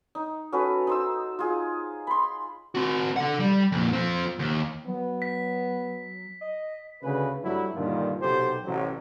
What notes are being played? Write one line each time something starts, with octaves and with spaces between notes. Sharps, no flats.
D#4
C#4 F#4 A4 B4
D#4 C5 E6
F4 G#4
B5 C6
C4 F#4
A4 F#5
G3
F2 A#2
F3 C4
D#2
F#3 B3
B6
D#5
D2 C#3 G#4 B4
G2 F#3 G3 A3 E4
G2 A#2 D3 D#3 F4
B1 C3 G4 A4 C5
A1 C3 F#3